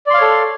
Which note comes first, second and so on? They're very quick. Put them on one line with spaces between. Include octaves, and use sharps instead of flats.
D5 C6 F5 C#5 A4